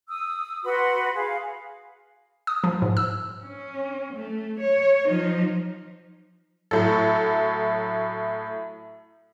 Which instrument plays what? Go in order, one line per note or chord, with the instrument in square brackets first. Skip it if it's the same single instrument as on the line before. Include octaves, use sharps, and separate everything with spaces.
[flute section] D#6 E6
F#4 B4 B5 C6
G#4 F5
[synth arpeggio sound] D#6
F3
G#2
E6
[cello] C#4
A3
C#5
F3 D#4
[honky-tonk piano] A2 F#3 A4